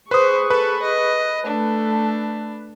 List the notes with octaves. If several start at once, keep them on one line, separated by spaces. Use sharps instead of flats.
G#4 B4 C5 C#6 D#6
A4 B4
D#5
A3 D4 A4